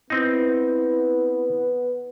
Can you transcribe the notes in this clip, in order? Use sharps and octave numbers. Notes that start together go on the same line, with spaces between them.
B3 C4 D#4 E4